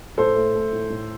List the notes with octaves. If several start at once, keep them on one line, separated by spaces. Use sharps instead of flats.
A2 A4 C5
A3
A3
A2
A2